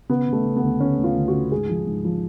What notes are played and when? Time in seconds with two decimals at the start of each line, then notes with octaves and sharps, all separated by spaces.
0.09 C#3 B3
0.27 C#3
0.33 A3
0.45 C#3
0.56 B3
0.63 D2
0.80 D2 C#4
0.98 D2
1.04 F4
1.16 D2
1.28 F#4
1.34 C#3
1.51 G#2 G#4
1.69 F3
1.87 G#2
2.05 F3